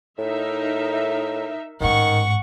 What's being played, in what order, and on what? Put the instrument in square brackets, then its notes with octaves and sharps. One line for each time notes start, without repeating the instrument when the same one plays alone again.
[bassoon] A2 [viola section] D#4 A#4 E5
[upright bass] A1 G#2 [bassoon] D#3 [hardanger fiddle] F#5 C#6